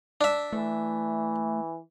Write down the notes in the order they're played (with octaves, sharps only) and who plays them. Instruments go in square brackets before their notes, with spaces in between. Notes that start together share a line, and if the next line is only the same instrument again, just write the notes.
[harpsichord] D4 E5 [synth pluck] D5
[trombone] E3 [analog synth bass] A3